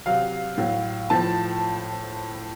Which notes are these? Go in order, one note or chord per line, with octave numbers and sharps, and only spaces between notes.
C3 F#3 F5
A2 F#3
A2 F3 A5